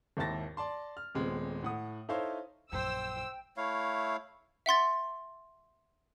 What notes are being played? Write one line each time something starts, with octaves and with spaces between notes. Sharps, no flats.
G#1 D#2 E4 A5 A6 A#6
D5 A5 C6
F6
D#1 G#3 B3 C4
A2 F#5 D#6
D#4 E4 A4 C5 C#5 F5
A#1 F#2 C5 G5 E6
A3 E4 C#5 F5
E5 F#5 C6 A6